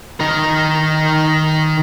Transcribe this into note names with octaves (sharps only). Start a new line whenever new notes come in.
D#3 A#4